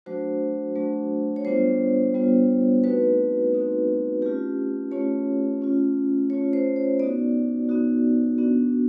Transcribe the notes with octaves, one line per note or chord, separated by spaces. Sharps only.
F#3 A3 D4 F#4 C5
F#3 A3 D4 F#4
C#5
G3 B3 D4 F4 C5
G3 B3 D4 F4
A3 C4 D#4 F#4 B4
A3 C4 D#4 F#4
A3 C#4 F4 G4
A3 C#4 F4 C#5
A3 C#4 F4
A3 C#4 F4 C#5
C5
C#5
B3 D#4 F#4 D5
B3 D#4 F#4
B3 D4 F#4